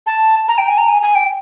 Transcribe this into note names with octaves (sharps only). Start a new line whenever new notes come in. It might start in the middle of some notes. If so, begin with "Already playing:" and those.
A5
A#5
G5
G#5
A#5
G#5
G#5
G5